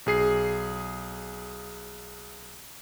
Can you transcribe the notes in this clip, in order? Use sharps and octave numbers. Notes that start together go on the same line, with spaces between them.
B1 G#4 C7